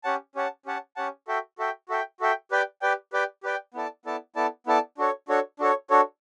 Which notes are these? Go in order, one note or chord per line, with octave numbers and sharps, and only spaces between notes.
C#4 G4 C#5 F#5 A5
C#4 G4 C#5 F#5 A5
C#4 G4 C#5 F#5 A5
C#4 G4 C#5 F#5 A5
F#4 A4 E5 G5
F#4 A4 E5 G5
F#4 A4 E5 G5
F#4 A4 E5 G5
G4 B4 D5 G5
G4 B4 D5 G5
G4 B4 D5 G5
G4 B4 D5 G5
B3 E4 A4 D5 A5
B3 E4 A4 D5 A5
B3 E4 A4 D5 A5
B3 E4 A4 D5 A5
D4 F#4 A4 C#5
D4 F#4 A4 C#5
D4 F#4 A4 C#5
D4 F#4 A4 C#5